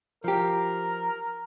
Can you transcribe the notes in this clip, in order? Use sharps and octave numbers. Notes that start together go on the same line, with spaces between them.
F3 G4 A#4